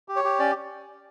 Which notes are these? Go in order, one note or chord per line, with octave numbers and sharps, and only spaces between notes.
G4
C#5
G4
C#4 D5